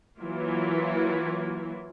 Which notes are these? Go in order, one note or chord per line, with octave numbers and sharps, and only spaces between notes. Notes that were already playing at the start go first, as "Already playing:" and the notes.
E3 F#3 A#3 E4 F4